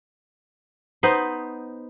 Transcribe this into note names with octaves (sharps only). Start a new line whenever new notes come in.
B3 D#4 B4 C5